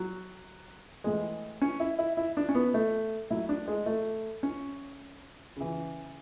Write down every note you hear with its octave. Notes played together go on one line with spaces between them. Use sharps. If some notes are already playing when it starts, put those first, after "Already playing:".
Already playing: F#3
A2 E3 G#3
C#4
E4
E4
E4
D4
C#4
B3
A3
A2 F#3 E4
D4
G#3
A3
C#4
C#3 E3